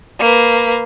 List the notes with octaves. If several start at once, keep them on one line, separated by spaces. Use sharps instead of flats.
A#3 B4